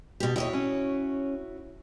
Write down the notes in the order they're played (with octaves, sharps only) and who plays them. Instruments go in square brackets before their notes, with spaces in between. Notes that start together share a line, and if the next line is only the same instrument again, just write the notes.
[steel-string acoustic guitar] B2 G4
[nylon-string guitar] D#2 D#5 [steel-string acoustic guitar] E4 F#4 C#5
[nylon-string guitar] C#4